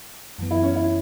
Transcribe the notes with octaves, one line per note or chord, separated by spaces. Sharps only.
F#2 E3 B3
E4
C#4
E4